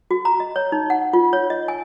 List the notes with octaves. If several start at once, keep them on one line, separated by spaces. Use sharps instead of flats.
F#4
A#5
D#5
C#5
D#4
F#5
F4
C#5
D#5
G#5